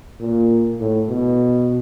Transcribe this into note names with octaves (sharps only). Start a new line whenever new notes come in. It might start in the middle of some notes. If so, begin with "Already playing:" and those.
A#2
A2
B2